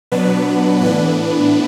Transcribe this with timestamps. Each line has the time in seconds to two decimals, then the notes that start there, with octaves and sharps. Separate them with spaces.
0.12 B2 F#3 B3 D4 B4
0.81 A2 E3 B3 D4 B4